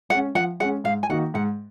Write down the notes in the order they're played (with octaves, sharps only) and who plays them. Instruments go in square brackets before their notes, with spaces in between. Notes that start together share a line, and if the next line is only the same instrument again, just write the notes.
[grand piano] G#3 [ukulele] F#5
[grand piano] C#4
[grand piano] F3 [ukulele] F#5
[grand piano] G#3 C#4 [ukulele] F#5
[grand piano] G#2 [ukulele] F5
[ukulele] G#5
[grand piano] D#3 A#3 D#4 F#4 [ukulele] F#5
[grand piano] G#2 [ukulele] F#5